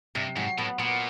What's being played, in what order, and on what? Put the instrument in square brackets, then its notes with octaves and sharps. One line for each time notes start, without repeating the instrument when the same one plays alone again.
[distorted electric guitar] G2 [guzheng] C3
[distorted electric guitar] G#2 [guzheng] F#3
[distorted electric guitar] A2 [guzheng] B3
[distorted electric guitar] A#2 [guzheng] B3